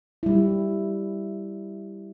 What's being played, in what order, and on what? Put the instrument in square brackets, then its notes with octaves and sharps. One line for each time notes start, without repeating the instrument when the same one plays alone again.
[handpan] G3 E4